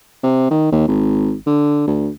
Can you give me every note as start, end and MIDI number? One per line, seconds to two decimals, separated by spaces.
0.23 0.47 48
0.50 0.70 51
0.72 0.87 39
0.87 1.34 32
1.46 1.86 50
1.87 2.09 38